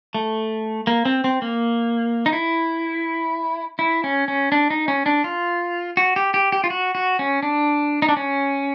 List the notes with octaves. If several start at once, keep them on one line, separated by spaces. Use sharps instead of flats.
A3
A#3
C4
C4
A#3
D#4
E4
E4
C#4
C#4
D4
D#4
C#4
D4
F4
F#4
G4
G4
G4
F4
F#4
F#4
C#4
D4
D#4
D4
C#4